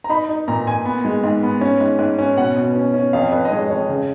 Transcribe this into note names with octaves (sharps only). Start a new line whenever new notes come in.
A#5
D#4 B5
D#4
A#2 A#5
A#2 G#5
B3
G#3
G#2
B3
C#4
G#2
G#2
C#4
B2 F#5
B2
C#4
C#4
F2 F5
F2 B4
D#5
G#3 C#5
F2 C#5
C#3